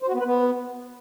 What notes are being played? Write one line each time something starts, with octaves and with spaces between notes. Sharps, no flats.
C5
F#4
B3
B4
B3